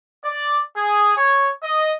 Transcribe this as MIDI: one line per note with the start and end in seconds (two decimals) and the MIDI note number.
0.25 0.59 74
0.77 1.13 68
1.17 1.52 73
1.63 1.95 75